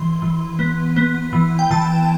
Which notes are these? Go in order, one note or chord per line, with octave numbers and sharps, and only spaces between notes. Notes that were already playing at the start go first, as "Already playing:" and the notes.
Already playing: E3 C6
E3
B3
B3
E3
G5
E3 A5